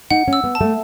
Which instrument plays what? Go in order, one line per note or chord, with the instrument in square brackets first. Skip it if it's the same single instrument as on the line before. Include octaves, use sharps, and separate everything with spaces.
[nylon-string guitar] D#4 [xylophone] F#5
[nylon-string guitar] C#4
[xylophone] E6
[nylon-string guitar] B3
[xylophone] A5
[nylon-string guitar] A3